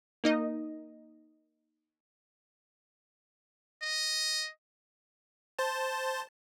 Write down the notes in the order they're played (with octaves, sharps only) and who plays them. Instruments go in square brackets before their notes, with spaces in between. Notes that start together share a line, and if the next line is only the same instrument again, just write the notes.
[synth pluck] A#3 D#4 D#5
[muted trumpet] D#5
[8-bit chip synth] C5 A5